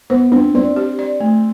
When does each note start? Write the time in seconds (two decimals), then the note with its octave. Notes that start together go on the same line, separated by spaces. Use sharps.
0.10 B3 C5
0.32 C4 D4
0.55 C4 D5
0.76 G4
0.99 D5
1.20 A3